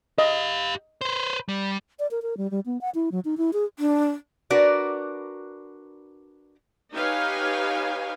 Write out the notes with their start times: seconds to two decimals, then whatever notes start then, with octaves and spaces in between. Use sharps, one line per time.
0.18 G4 D#5 F5
1.01 B4 C5
1.49 G3
1.99 D5
2.11 A#4
2.22 A#4
2.37 G3
2.51 G3
2.66 B3
2.81 F#5
2.95 E4
3.12 F#3
3.25 D#4
3.38 E4
3.53 G#4
3.78 D4
4.50 D4 F#4 A#4 B4 D5
6.92 D#4 G4 B4 C#5 F5 G#5